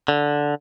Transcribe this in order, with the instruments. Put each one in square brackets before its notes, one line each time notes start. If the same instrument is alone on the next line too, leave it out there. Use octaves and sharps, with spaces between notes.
[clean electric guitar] D3